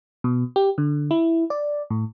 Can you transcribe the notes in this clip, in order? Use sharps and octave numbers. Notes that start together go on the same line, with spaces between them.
B2
G4
D3
E4
D5
A2